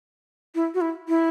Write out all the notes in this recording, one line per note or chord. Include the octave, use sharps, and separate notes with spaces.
E4
F#4
E4
E4